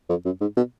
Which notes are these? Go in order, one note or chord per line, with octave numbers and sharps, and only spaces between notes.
F2
F#2
G#2
B2